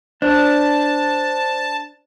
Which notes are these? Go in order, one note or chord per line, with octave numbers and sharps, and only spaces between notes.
D4 C5 D5 A5